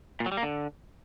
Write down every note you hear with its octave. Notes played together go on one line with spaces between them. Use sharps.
A#2
F#3
G3
A#3
D3